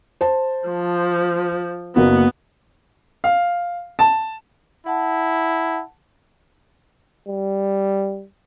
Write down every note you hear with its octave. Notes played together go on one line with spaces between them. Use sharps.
C5 A5
F3
F#1 A#3 B3 F#4
F5
A5
E4 F#5 A5
G3